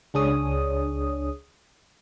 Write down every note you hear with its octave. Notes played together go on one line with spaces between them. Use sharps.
C#2 D4 G#4 C#5 D#6